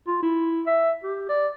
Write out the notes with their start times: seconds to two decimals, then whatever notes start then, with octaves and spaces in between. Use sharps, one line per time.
0.07 F4
0.22 E4
0.67 E5
1.03 G4
1.29 D5